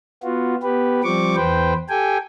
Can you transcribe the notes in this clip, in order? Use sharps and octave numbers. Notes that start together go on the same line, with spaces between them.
B3 F4 F#4
B3 G4 B4
F3 G3 C4 C#6 D6
E2 B4 C5 G5
G4 A4 G5 G#5